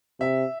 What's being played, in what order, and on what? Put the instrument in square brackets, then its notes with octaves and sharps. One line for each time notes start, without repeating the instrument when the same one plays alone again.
[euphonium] C3 [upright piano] E5